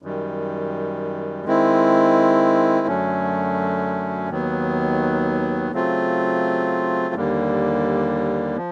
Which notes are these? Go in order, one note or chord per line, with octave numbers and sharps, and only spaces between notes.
F#2 D#3 G3
D#3 G#3 C4 E4
F#2 D3 F#3 A3 C#4
D#2 D#3 F#3 B3
C#3 F#3 A3 C4 F4
D#2 D3 G3 A#3
F3